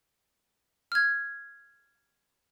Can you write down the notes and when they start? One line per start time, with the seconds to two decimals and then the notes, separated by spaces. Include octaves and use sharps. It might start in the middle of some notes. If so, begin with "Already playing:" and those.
0.92 F6 G#6